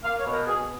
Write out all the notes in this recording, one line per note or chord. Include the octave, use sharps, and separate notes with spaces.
A#3 F5
C#5
B2
A#4
B2 G#4